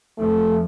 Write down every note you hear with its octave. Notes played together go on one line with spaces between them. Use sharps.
F2 F3 A3